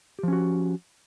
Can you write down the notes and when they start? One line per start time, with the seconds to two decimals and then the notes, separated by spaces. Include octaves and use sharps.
0.19 G4
0.23 F3
0.28 C#4
0.33 F#4